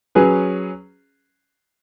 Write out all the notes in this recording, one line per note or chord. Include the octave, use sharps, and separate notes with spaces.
F#3 C#4 G#4 B4